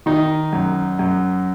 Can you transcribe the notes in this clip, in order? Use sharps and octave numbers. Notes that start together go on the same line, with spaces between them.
D#3 D#4
F#2
F#2